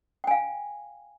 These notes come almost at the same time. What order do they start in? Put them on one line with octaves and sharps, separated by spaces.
G5 G#5 F5